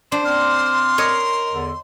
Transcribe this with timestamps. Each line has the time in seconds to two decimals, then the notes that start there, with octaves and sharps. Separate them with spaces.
0.12 D4 C5
0.25 C4 C6 D6 F6
0.98 A#4 C#5 D#5
1.51 E2 D3